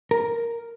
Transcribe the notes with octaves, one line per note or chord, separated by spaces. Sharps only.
A#4